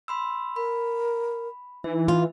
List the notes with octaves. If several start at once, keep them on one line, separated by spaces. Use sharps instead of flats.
B5 C6 E6
A#4 B5
E3 D#4 E5
F4